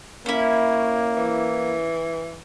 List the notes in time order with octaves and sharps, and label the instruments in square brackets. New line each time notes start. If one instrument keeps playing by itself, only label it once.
[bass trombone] A#3 [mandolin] C#4 E4
[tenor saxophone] E3